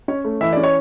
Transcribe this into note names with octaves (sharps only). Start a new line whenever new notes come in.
C#4 C#5
A3
E3 E5
C#4 D5
C#5